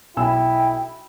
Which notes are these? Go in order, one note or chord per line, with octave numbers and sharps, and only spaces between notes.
B1 E4 G5 G#5 E6